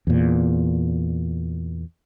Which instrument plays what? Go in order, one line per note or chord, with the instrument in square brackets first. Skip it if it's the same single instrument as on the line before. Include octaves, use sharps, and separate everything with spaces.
[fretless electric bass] E2 A#2